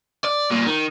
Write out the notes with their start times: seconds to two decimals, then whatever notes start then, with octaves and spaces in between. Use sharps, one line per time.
0.25 D5
0.51 C2 A#2
0.67 D#3